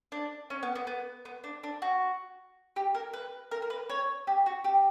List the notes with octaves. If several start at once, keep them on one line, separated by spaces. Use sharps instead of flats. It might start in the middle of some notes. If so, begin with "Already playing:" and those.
D4
C#4
B3
B3
B3
B3
D4
D4
F#4
G4
A#4
B4
A#4
A#4
B4
C#5
G4
F#4
G4